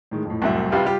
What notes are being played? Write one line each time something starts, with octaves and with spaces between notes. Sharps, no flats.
A2 D#3 G#3
F2 A2
C2 F#2 E5
C3 G3 F4 B4 E5 F5
G3 F4 G4